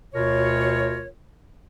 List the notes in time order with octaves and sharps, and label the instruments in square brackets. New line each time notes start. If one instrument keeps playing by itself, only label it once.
[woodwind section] D2 B2 F4 A#4 C#5